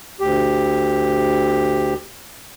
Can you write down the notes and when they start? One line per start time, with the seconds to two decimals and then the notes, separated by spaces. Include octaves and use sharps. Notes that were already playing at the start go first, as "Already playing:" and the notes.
0.20 D2 G4